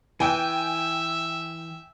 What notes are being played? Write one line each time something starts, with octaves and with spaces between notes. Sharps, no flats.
E3 E5 G5 G#5